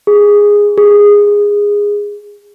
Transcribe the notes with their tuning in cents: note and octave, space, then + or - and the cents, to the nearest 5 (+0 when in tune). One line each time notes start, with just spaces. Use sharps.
G#4 -10
G#4 -15